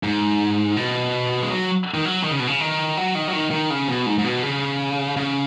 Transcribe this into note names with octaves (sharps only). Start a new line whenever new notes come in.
G#2
B2
G#3
F#3
D#3
F#3
D#3
C#3
B2
C#3
D#3
F#3
D#3
F#3
D#3
D#3
C#3
B2
G#2
G#2
B2
C#3
C#3